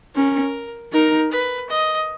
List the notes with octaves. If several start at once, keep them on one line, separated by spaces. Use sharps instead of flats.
C#4 A#4
D#4 A#4
B4
D#5